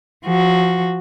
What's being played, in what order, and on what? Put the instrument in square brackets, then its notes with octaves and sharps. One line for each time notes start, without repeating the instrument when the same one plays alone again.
[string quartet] F3 F#4